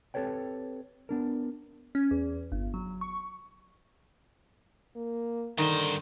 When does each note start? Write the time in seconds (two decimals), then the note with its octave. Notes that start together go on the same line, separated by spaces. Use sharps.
0.14 C4 G4 A4 B4 C#5 G5
1.09 B3 D4 A#4
1.95 C#4
2.11 E2
2.52 G1
2.74 F#3
3.01 C#6
4.96 A#3
5.58 G2 D3 D#3 C5